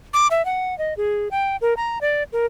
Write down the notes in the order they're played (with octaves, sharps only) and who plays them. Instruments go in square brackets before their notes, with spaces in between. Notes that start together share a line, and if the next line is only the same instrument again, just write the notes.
[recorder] D6
E5
F#5
D#5
G#4
G5
A#4
A#5
D5
A#4